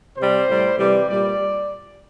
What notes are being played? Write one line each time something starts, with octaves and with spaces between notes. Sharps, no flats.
C3 G3 C5
A2 G3
C3 E3 G3 D5
A#2 G3 D5